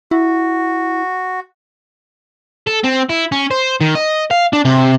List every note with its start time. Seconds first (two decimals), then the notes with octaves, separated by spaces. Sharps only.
0.11 E4 F#4
2.67 A4
2.84 C4
3.10 E4
3.32 C#4
3.51 C5
3.81 D#3
3.95 D#5
4.31 F5
4.53 D4
4.65 C3